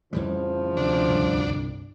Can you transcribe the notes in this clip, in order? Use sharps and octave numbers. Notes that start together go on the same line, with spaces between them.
F2 A2 C#3 E3 F3 G3
D2 C3 D4
C2 G2